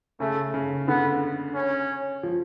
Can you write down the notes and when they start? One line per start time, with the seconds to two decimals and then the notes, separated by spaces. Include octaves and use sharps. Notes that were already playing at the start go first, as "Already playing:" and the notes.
0.20 C#3 A3
0.54 C#3
0.88 D3 B3
1.55 C#4
2.23 F3